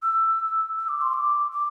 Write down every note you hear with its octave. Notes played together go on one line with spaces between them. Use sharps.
E6
E6
D6
C6
D6
D6